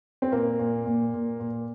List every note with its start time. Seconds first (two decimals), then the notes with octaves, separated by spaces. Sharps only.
0.22 C4
0.32 A#2 A#3
0.59 A#2
0.86 A#2
1.14 A#2
1.40 A#2